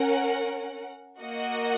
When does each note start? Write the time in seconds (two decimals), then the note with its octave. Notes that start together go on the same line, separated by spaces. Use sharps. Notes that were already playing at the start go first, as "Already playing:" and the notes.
Already playing: C#4 A#4 F#5
1.20 A#3 F#4 D#5 F#5